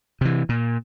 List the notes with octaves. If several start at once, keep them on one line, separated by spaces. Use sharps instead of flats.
C3 E3
A#2